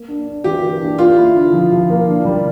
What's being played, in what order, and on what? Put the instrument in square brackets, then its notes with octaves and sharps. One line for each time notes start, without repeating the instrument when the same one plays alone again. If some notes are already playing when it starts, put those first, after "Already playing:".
Already playing: [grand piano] A#3
D4
D4
[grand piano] E3 [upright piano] G4
[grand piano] A#3
D4
[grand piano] A#3 [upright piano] F4
[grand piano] E4
D3
F3
F3
A#3
D4
G3